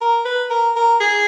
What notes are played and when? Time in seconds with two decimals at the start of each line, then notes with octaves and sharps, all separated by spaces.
0.01 A#4
0.25 B4
0.50 A#4
0.76 A#4
1.00 G#4